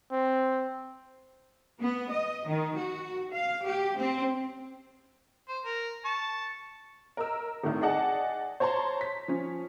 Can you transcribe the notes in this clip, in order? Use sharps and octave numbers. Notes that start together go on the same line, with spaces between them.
C4
B3
D#5
D#3
F#4
F5
G4
C4
C5
A#4
A5 C#6
A#4 D#5 E6
G#1 A2 D#3
G#4 D5 D#5 F#5 A5
C5 C#5 A5 A#5 C6
B6
F3 C#4